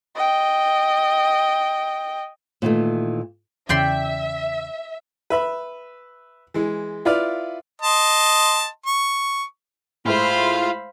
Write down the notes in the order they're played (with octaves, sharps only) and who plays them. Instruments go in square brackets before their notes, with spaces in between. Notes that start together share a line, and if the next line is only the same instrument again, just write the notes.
[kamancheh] D#5 G5
[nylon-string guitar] A#2 D#3 E3 A3
[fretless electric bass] E2 C#3 [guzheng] D5 G5 C6 [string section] E5
[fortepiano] B4 E5 B5
E3 G#3
E4 F4 B4 D5 F5
[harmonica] D#5 A5 C6
C#6
[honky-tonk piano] A2 G#3 E4 [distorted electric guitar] F4 [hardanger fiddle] C5 F5 [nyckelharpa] B5